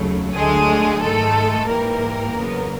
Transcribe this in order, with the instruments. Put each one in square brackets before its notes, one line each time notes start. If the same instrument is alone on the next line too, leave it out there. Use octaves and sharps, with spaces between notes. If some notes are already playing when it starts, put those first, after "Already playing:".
Already playing: [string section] D#2 C#3 F#3 A3
D2 D3 F#3 G#3 A3 G#4
G#2 D#3 G#3 A3 A4
G#2 E3 G3 A#3 A#4
E2 C#3 F#3 B3